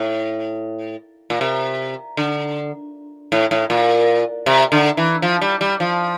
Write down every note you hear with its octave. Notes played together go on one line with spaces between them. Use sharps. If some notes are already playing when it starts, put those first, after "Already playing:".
Already playing: A2
A#2
C3
D3
A2
A2
A#2
C3
D3
E3
F3
G3
G3
F3